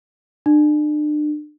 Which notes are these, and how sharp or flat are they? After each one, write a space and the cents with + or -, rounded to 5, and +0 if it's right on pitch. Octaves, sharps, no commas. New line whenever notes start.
D4 +35